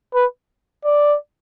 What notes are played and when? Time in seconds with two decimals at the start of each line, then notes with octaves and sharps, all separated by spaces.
0.14 B4
0.85 D5